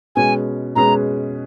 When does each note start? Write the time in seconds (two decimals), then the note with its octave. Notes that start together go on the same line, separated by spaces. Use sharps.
0.16 B2 G#3 C#4 G#4 B4 G#5
0.76 B2 G#3 C#4 G#4 B4 A#5